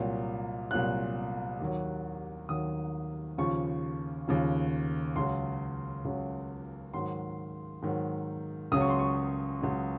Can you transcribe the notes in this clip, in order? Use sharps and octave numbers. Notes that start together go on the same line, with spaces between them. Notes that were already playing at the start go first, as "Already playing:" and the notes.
Already playing: C2 A#2 F#3
C2 A#2 F#3 F#6
D#2 D#3 F#3
D#2 D#3 F#3 D#6
D#2 C#3 F3 C#6
D#2 C#3 F3
C#2 C#3 F#3 C6
C#2 C#3 F#3
G#2 D#3 F#3 C6
G#2 D#3 F#3
C#2 C#3 F#3 D#6
C#6
C6
C#6
C#2 C#3 F#3